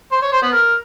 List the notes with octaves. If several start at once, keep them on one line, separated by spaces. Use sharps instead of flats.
C5
C#5
C5
B3
A#4